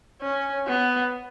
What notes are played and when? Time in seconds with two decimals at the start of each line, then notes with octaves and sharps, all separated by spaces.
0.22 C#4
0.67 B3